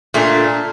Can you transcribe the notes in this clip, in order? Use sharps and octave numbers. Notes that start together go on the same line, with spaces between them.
A#2 A3 D4